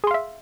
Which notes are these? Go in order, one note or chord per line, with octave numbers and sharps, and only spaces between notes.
G#4 E5 F5 C6